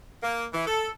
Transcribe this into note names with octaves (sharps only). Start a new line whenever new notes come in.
A#3
E3
A4